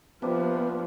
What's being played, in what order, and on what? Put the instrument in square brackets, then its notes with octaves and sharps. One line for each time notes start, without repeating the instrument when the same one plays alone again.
[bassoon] C3 [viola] F3 [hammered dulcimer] A#3 D4 G4 [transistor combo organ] B3